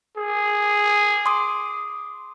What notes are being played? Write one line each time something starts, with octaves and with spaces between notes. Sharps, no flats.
G#4
C6 D6 D#6